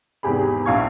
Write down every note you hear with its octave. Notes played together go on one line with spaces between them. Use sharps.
G#1 E2 C3 G4 G#4 B5
A#1 E4 F5 A5 C#6 G#6